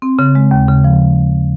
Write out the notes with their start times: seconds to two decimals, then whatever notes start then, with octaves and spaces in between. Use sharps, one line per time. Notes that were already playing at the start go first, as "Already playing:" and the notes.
0.02 C4
0.19 C#3
0.35 G#3
0.51 D#2
0.68 C#3
0.84 F3